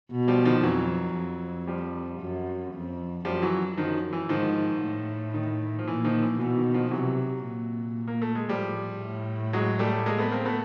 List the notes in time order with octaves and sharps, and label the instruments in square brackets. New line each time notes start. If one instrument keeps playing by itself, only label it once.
[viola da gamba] B2
[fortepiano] F3 G3
D#3 F3
[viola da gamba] F2 [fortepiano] E3 F#3
[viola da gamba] F2
[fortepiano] F3 G3
[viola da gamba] F#2
F2
[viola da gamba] F#2 [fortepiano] F3 G3
[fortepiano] E3 F#3
[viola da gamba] F#2 [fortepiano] D#3 F3
[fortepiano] E3
[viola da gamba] G#2 [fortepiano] D#3 F3
[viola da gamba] A2
[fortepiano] D#3
F3
[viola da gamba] A#2 [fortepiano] E3
[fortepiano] D#3 F3
E3
[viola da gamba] B2 [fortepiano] E3
[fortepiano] D#3
D#3 F3
[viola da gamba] C3 [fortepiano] E3 F#3
[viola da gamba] A#2
[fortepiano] A#3
A3
G#3
[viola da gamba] A2 [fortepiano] F3 G3
[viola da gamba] A2
[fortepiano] F#3 G#3
G3 A3
G#3 A#3
A3 B3
A#3 C4
A3 B3